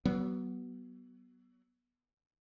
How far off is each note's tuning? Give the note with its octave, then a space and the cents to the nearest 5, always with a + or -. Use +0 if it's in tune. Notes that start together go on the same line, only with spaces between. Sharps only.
F#3 +30 B3 -10